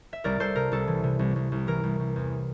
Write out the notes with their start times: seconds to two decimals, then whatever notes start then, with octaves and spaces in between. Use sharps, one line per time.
0.13 E5
0.24 C2 A#4 D5
0.40 C2 A4 C5
0.56 C3 A#4
0.72 C2 A4
0.87 E3
1.04 C3
1.19 C2
1.36 C2
1.52 C2
1.67 E3 A#4
1.84 C2
1.99 C2
2.16 E2